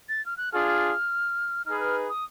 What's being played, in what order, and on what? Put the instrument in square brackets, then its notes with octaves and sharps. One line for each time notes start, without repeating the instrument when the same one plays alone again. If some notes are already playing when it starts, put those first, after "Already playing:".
[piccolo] A6
F6
F#6
[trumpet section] D4 F4 G#4 [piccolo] F6
[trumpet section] D#4 G#4 B4 [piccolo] F6
[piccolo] F6
D#6